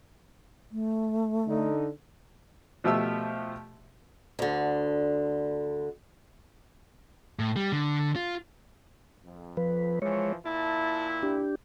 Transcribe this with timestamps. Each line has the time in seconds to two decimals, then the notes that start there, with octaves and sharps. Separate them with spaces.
0.72 A3
1.47 D3 D#4
2.84 B2 F3 A3 G4 E5 E6
4.39 D2 D3
7.39 A2
7.56 G3
7.72 D3
8.16 F4
9.24 F2
9.57 F3 B4
10.02 E3 F3 G#3 C#5
10.46 A#2 E4 A5
11.23 D4 G4